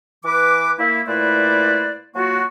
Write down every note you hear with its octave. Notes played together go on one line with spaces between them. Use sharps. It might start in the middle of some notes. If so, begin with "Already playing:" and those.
E3 B4 D6
A#3 E4
A#2 A3 E4 B4 C5 D5
F#3 A#3 F4 F#4